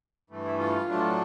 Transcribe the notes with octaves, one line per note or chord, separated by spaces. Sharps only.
G2 E3 A3
E4
F4
A2 F#3 A3 D4